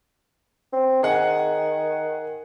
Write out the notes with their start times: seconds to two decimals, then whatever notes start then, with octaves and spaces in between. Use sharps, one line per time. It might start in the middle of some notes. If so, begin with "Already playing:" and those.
0.73 C4
1.03 D#3 G#4 F#5 G#5